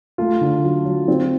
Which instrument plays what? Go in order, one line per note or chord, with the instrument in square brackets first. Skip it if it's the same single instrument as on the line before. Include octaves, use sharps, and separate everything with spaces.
[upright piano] A3 [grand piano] F4
[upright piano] D3
F#3
F#3
C4